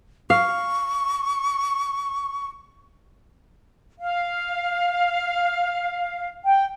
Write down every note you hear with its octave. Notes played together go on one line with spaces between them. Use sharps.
F5 C#6
F5
G5